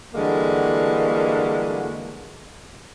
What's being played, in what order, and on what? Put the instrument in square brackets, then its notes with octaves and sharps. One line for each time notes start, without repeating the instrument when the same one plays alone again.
[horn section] D3 E3 G3 G#3 A#3 F#4